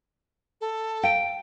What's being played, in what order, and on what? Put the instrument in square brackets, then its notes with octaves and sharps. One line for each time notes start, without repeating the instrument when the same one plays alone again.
[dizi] A4
[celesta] F5 D7 [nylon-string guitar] G5